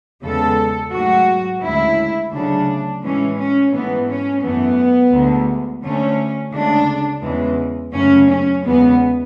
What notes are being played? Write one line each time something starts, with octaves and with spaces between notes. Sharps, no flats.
E2 C#3 G#3 A4
G#2 F#3 A3 F#4
D2 C#3 G#3 E4
D2 C#3 F#3 A3 D4
A2 E3 G#3 C#4
C#4
G#2 E3 A3 B3
C#4
F#2 E3 A3 B3
D2 D3 G#3
D2 D3 A3 C#4
D2 C#3 G#3 D4
E2 C#3 E3 G#3
F#2 C#3 F#3 A3 C#4
C#4
E2 C#3 E3 G#3 B3